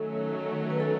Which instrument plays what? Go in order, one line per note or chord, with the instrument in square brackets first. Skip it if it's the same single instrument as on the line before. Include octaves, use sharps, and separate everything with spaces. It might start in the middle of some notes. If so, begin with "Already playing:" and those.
Already playing: [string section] D#3 F#3 A3 C#4 [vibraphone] A4
[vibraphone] B4
A4